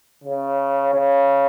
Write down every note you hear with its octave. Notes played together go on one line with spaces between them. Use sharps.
C#3
C#3